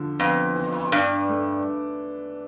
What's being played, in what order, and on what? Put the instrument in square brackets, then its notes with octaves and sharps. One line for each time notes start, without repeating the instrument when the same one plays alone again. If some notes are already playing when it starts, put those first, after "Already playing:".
Already playing: [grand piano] D3 F3
[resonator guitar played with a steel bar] F2 [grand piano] B3
[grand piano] E3
[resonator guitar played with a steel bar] G2 [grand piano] D4
[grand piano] A3